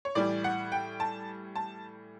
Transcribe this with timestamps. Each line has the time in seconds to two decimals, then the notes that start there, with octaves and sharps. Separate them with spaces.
0.05 C#5
0.15 A2 E3 G3 D5
0.44 F#5
0.72 G5
1.00 A5
1.56 A5